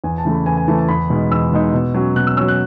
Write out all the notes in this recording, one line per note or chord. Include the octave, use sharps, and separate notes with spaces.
E2 G#5
A5
C#3 E3 A3
B5
E2 G#5
G#5
C#3 E3 A3 A5
A5
E2 B5
B2 G#3 D#4
E2 E6
B2 G#3 D#4
B2
F#3 C#4
B2 F#6
E6
F#3 C#4 E6
F#6